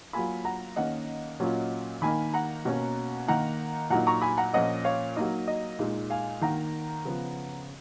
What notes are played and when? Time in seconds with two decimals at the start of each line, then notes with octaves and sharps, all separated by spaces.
0.13 F#3 A#3 F4 G#5 B5
0.45 F#5 A#5
0.76 D#3 A#3 C#4 D#5 F#5
1.40 A#2 F#3 A#3 C#4 F4
2.02 D#3 A#3 D#4 G#5 B5
2.34 F#5 A#5
2.65 B2 A#3 C#4
3.28 D#3 A#3 D#4 F#5 A#5
3.90 A#2 F#3 A#3 D#4 F#5 A#5
4.07 A#5 C#6
4.22 G#5 B5
4.38 F#5 A#5
4.53 A#2 F3 A#3 C#4 D#5 F#5
4.84 C#5 F5
5.17 F#3 A#3 D#4 D#5
5.47 D#5
5.79 A#2 G#3 D#4
6.10 F5 G#5
6.41 D#3 A#3 D#4 F#5 A#5
7.05 C#3 F3 B3